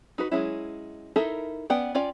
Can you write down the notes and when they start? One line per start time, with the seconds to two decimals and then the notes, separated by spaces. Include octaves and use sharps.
0.18 D#4 F#4 B4
0.31 F#3 G#3 C#4 E4
1.16 D#4 E4 A4 A#4 E5
1.70 B3 C#4 D5 F#5 G5
1.95 C#4 F4 D5 G5